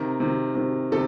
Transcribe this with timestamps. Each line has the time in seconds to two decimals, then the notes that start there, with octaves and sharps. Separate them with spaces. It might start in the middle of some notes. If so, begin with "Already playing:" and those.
Already playing: C3 D#3 A#4
0.20 C3 D#3
0.55 C3 D#3
0.92 C3 D#3 A4